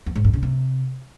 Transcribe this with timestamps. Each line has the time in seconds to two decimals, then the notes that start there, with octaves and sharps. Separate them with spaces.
0.06 E2
0.15 G#2
0.25 G2
0.34 C#3
0.43 C3